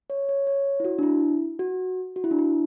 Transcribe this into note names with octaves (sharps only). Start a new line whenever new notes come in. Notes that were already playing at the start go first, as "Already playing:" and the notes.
C#5
C#5
C#5
E4
F#4
D4
E4
F#4
F#4
E4
D4
E4